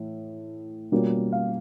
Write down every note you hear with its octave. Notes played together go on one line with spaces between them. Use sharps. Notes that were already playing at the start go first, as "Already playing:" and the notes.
Already playing: A2 E3
B2 G3 A#3 C#4 F4
F5